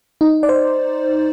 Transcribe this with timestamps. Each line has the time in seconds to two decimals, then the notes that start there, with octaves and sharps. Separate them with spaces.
0.21 D#4
0.43 D5
0.49 C5